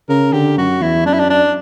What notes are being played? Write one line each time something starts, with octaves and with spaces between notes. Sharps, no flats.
C#3 A#4
D3 G4
F#2 F#4
E2 E4
F#2 D4
E4
D4
D4